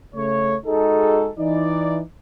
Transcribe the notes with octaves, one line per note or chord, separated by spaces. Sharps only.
C#3 A3 C#5
G#3 D#4 F#4 G#4 A4
E3 D#4 D5